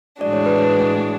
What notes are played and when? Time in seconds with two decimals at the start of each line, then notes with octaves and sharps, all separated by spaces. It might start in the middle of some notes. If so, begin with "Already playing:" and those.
0.21 A2 E3 G#3 D4 F#4 D5
0.33 C#5
0.46 B4
0.58 C#5